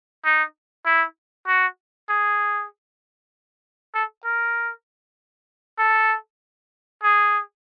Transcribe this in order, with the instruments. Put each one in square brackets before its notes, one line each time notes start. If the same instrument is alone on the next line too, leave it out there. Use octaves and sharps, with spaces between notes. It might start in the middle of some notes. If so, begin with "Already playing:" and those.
[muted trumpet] D#4
E4
F#4
G#4
A4
A#4
A4
G#4